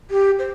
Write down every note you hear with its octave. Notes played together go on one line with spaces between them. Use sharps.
G4
C5